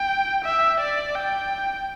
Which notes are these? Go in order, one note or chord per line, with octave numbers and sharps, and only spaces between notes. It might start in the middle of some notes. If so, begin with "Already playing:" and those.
Already playing: G5
E5
D5
G5